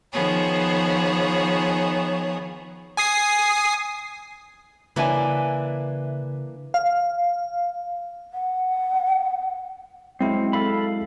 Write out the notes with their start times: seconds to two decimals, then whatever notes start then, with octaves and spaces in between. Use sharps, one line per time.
0.12 D#3 F3 B3 G#4 C#5
2.97 G#5 D#6 C7
4.96 C#3 E3 A#3 D4 E4 G#5
6.74 F5
8.33 F#5
10.20 F#3 G#3 C4 E4
10.53 A4 F5 B5